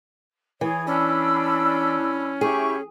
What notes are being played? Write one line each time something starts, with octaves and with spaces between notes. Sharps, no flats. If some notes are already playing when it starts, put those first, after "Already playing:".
E3 G#4 C#5
C#4 D4 B5 E6
E4 G4 G#4 C#6